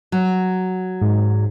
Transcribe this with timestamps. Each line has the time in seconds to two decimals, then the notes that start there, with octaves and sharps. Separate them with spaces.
0.12 F#3
1.01 G#2